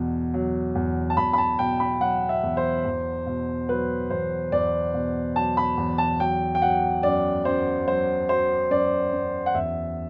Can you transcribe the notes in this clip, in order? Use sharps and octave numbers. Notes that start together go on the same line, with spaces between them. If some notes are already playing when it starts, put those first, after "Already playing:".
Already playing: E2 B2
F#3
E2
A5
E2 B5
B5
A5
B2 G5
B5
F#3 F#5
E5
E2
C5
E2
B2
F#3 B4
E2 C5
E2 D5
B2
F#3 A5
B5
E2
A5
F#3 G5
G5
F#3 F#5
F#2 D5
F#2 C5
F#3 C5
F#3 C5
F#2 D5
F#2
F#5
E2 E5